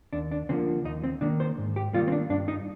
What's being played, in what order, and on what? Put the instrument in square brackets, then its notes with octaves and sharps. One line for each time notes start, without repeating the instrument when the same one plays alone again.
[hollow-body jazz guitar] D#2 D4
D4
D3 F3 A#3 C4
D#2 D#4
C4
D#3 A#3 D4
C5
G#2
G4
D#3 G3 A#3 F4
C4
D4
G2 D4
D#4